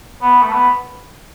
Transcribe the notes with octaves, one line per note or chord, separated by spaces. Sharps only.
B3
A3
B3